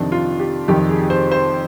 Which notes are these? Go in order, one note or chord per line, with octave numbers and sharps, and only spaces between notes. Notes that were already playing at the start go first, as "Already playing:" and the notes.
Already playing: F2 C3 D#3 D4
F4
G4
F2 C3 D#3 G4
G#4
C5
C5